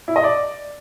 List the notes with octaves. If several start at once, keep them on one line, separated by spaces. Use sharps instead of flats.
E4
D#5
D5